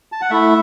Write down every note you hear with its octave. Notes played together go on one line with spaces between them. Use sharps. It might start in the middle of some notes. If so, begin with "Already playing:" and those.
A5
F#5
A3 E4 E5